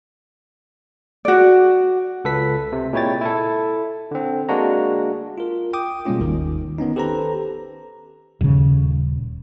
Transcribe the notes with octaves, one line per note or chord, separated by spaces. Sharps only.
F#4 D5
C#2 A4 B4 B6
C3
A#2 G#3 E4 C#5 G5 A6
E4 A4
D3 C4
G#3 A#3 D4 F#4 A#5
F4 A#4
G5 D6 D#6
B2 G3 G#3 A#3 C#4 F4
G1 D#2 D#3
D#3 B3 C#4 D#4
G4 A4 B4 C5 A#5
D#1 C#3